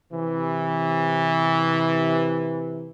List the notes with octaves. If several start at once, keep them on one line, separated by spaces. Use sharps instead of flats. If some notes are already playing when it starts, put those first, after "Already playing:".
C3 E3